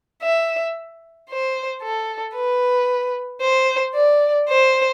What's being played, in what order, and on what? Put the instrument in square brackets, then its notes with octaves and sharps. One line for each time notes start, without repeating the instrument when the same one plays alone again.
[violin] E5
C5
A4
B4
C5
D5
C5